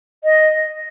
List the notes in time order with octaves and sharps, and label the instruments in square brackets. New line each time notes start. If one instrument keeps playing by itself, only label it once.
[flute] D#5